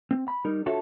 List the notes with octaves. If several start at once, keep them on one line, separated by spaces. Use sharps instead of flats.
C4
B5
G3 D#4 A#4
D4 F4 F#4 A4 C#5 E5